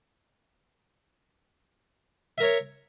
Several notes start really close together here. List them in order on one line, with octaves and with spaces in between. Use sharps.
E5 A#4 C#5